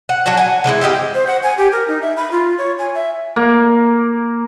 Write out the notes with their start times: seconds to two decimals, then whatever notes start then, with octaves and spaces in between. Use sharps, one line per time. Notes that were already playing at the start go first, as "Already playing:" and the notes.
0.09 F#5
0.26 F#3 C#4 D4 F#4
0.37 F#5 G#5
0.64 D3 E3 G#3 E4
0.81 C4 F4 G4 D#5
1.15 C5
1.27 F#5
1.43 G#5
1.58 G4
1.72 A#4
1.88 D#4
2.02 E5
2.17 B5
2.32 F4
2.58 C#5
2.79 G#5
2.95 E5
3.36 A#3